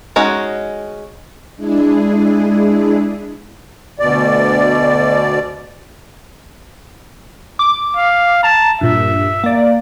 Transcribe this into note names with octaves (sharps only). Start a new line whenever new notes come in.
G#3 C#4 D#4 F#4
G#3 D4 E4 G#4
D2 B2 D5
D6
F5
A5 A#5
G2 A#2 E5
A#3 D5